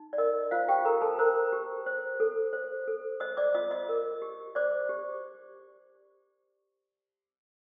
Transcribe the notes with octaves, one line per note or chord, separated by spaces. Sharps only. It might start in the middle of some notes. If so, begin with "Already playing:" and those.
Already playing: D#4
D5
A#4 D#5
F4 C5 F5
G4 G5
A4 A#4 A#5
A4 A5
A#4 C5 A#5
G4
C5
A4
C5
A4
C5 D#5 D#6
D5 D6
F4 D#5 D#6
D#5 D#6
A#4
G4
C5 D5 D6
G4